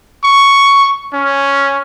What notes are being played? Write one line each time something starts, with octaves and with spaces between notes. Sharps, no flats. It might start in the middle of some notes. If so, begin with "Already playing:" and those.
C#6
C#4